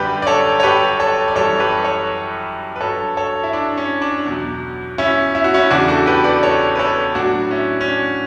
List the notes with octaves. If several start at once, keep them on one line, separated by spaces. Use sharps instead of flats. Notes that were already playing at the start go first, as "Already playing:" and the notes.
Already playing: F#2 D3 G3 G4 B4
D5
A4 C#5
C#5
G4 B4
A4 C#5
D5
F#2 E3 G3 A4 C#5
G4 B4
A4 C#5
B4
G2 F#3 A4 C#5
A4 C#5
E4
D4
C#4
D4
E2 B2 F#3
C#4 E4
E4
F#4
C#4 E4
E2 C#3 E3 D4 F#4
F#4 A4
G4 B4
B4 D5
A4 C#5
B4
A4 C#5
A2 F#3 D4 F#4
C#4 E4
C#4
D4